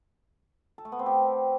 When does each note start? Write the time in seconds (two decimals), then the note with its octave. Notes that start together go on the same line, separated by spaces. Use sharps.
0.78 A4
0.85 A3
0.92 B3
0.99 C4
1.06 G4